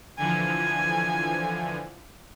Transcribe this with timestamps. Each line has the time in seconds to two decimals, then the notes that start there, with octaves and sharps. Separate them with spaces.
0.18 D3 E3 F3 G#5